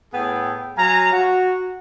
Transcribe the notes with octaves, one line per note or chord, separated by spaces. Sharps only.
A2 B3 G#4 A4 G5
F#3 F5 G#5 A#5
F#4